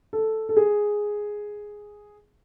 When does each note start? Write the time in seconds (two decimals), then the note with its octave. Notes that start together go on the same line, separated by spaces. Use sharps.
0.13 A4
0.49 A4
0.57 G#4